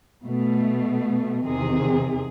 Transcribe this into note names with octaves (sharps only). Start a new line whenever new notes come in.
B2 A3
E2 C3 D#3 G#4